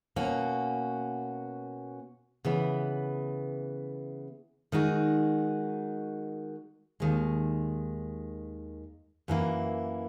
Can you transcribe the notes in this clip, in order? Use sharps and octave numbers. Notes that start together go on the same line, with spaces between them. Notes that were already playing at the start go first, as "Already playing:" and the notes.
B2 A#3 C#4 F#4
C#3 E3 B3
D#3 G#3 D#4 F#4
D#2 D#3 G#3
F#2 E3 A#3 E4